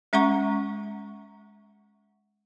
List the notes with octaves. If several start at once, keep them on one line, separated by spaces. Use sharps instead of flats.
G#3 C#4 E5 F#5 A#5 C#6